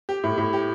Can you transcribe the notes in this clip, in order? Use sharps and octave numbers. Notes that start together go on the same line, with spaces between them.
G4
A2
A2
G4